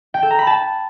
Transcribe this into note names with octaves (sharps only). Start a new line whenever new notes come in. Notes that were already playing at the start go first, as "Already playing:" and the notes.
G5
A4
A#5
B5
A5